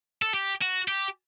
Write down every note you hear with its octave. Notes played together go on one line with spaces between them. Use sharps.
A4
G4
F#4
G4